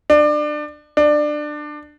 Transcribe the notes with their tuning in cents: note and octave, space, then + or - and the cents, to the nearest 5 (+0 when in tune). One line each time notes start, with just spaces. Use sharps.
D4 +25
D4 +20